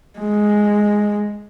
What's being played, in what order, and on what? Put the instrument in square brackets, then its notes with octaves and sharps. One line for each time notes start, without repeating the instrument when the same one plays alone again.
[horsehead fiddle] G#3